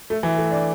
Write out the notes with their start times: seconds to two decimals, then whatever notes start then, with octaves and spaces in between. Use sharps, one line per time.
0.10 A3
0.23 E3
0.37 A3
0.51 D4